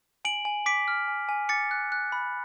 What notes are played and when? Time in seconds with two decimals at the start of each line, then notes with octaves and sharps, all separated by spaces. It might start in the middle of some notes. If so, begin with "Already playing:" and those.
0.25 G#5 D7 F#7
0.45 G#5
0.66 D6 B6 D7
0.88 F6
1.08 G#5
1.29 G#5
1.49 D6 A6 C#7
1.71 F#6
1.92 F#6
2.12 B5